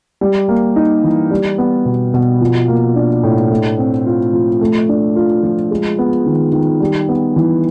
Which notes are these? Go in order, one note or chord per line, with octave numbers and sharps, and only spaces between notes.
G3
A#3
D#4
E3
G3
B3
B2
B2
F3
A#3
D4
A2
A3
C4
F4
F3
A3
D4
F4
F3
G#3
B3
D#3
D#3
G3
B3
E3